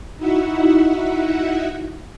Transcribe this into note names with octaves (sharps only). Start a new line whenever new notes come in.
D#4 E4 F#4 E5 F#5